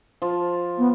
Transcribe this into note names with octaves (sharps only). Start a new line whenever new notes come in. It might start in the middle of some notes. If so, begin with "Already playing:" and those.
F3
B3